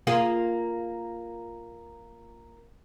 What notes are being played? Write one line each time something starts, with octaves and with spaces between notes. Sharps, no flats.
A#3 F4 G#4